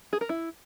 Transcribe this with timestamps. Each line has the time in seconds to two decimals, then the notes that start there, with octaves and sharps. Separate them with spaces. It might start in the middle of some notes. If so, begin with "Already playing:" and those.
0.13 G#4
0.21 A#4
0.29 E4